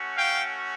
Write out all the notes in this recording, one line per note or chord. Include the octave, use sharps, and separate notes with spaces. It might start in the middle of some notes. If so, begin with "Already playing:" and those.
Already playing: A3 C#4 F#4
F5 G5